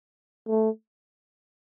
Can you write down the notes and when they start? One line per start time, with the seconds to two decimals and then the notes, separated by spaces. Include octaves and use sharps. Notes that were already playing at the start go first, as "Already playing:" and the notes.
0.48 A3